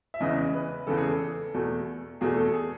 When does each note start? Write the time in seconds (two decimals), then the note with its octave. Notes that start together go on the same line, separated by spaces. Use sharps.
0.14 E5
0.20 E2 C#3 E3 D#5
0.54 B4
0.87 E2 C#3 E3 A4
0.97 G#4
1.08 A4
1.54 E2 B2 A3
2.21 E2 B2 A3 G#4
2.37 A4
2.54 G#4